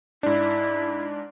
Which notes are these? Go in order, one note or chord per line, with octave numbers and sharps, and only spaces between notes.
G#2 D4 E4 D5